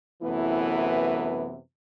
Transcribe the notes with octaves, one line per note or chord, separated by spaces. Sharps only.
F#2 C3 E3 A3 B3 E4